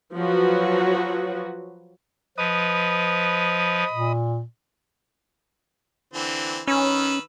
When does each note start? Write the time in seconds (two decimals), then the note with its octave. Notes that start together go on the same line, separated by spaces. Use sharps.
0.15 F3 F#3 F#4 B4
2.38 F3 B4 D#5 B5 D#6
3.91 A#2
6.13 D3 E3 C4
6.68 D#3 C#4 B4 E6